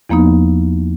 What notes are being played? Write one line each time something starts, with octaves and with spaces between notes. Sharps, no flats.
E2 F3 A#3 B3 D#4